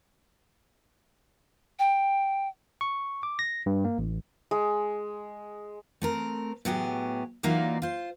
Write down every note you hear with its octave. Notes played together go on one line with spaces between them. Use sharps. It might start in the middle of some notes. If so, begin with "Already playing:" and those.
G5
C#6
D6
A#6
G2
A#3
A1
G#3
A3 C4 A#4
A2 F#3 B3 G4 G#4
E3 F#3 A#3 D#4 F4 D5
F4 C5